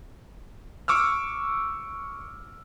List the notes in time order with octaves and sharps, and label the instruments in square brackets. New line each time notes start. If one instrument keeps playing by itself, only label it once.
[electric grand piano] C#6 D6 E6 F6